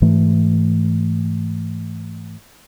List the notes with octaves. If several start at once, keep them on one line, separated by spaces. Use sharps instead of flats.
G#2 E3 A3